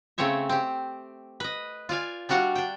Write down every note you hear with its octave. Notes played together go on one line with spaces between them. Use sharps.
C#3 A3 C4 C#5 E5
C4 G4
B4 D#5
F4 D5 F5 G#5
G3 D4 F#4 F5 F#5
D4 G5